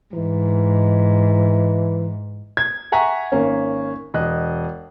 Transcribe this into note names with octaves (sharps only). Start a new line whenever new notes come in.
G#2 E3
G#6
E5 F#5 G#5 A#5 C#6 B6
G#1 A#3 C#4
E1 D#5 F#6